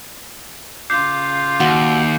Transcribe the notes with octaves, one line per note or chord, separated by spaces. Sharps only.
C#3 F4 D6 G6 C7
D#2 F#4